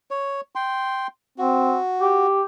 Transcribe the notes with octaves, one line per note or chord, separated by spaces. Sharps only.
C#5
G5 C6
C4 F#4
G4